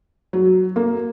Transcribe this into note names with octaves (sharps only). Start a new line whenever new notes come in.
F#3
A#3